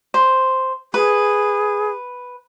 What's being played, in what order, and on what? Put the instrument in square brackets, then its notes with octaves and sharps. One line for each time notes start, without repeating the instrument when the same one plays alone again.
[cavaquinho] C5
[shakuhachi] G#4 [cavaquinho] B4